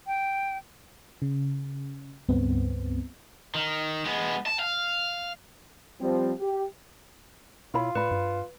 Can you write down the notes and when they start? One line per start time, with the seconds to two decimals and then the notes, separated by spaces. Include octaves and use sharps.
0.07 G5
1.22 C#3
2.29 C#2 G2 B3 C4
3.55 D#3
4.05 G#3 B3
4.46 A5
4.59 F5
6.01 F3 G3 C4
6.40 G4
7.74 B2 E4 F4 C#5 B5
7.95 A2 B4 D5 B5
8.11 G2